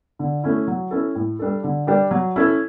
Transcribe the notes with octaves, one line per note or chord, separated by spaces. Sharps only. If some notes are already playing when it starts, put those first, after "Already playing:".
D3
A3 C#4 E4
F#3
C#4 E4 A4
A2
G3 D4 A4
D3
G3 D4 G4
F#3
C#4 E4 A4